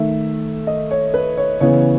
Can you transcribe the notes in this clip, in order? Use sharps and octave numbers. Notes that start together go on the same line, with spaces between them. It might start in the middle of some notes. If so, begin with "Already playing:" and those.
Already playing: D#3 A3 E5
D#5
C#5
B4
C#5
C#3 E3 B3 C#5